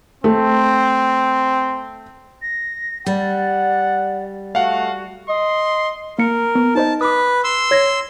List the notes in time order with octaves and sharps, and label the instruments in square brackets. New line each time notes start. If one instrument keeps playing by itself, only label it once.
[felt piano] A3 [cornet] C4
[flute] A#6
[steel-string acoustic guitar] G3 [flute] D5 [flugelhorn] F#5
[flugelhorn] A3 [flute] F#4 [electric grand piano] F5 F#5
[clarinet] D#5 [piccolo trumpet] C6
[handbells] A#3 C#7 [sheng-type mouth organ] A#4
[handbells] B3
[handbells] D#4 C5 D#5 [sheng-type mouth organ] A5
[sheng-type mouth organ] B4 [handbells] D6 D#6
[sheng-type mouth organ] C6 E6
[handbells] C#5 G#6 A#6